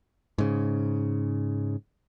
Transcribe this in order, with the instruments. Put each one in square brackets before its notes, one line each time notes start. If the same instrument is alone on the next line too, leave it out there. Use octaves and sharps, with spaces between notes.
[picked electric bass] G#2 C#3